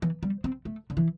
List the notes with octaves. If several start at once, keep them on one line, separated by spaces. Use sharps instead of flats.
E3
G3
C4
A3
D3
E3